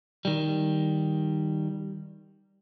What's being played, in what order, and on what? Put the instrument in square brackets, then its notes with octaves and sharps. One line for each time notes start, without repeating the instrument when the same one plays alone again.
[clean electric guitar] D#3 G3